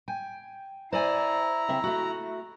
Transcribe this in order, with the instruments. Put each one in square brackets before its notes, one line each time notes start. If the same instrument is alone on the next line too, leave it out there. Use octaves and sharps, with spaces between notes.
[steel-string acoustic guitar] G5 G#5
[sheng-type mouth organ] E4 A#5 [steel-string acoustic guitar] C5 D5 G#5
[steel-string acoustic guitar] C#3 C4 E5
A3 F#4